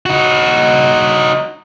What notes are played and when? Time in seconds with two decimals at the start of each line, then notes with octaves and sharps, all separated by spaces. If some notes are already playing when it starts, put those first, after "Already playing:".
0.06 D#4 F#4